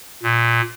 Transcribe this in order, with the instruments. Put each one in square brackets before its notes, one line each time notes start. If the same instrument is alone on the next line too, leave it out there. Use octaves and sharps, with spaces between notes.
[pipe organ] A#2